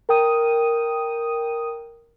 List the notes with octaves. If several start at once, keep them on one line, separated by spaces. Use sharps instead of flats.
A#4 G5 D#6 D#7